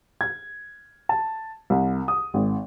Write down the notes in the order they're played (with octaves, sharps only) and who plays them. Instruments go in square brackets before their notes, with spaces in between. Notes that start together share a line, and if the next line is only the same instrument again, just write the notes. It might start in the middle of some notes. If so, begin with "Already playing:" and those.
[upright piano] G#6
A5
C2
D#6
G#1